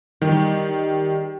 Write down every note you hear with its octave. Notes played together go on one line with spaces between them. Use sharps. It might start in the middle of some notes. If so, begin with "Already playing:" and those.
D#3 G3 G4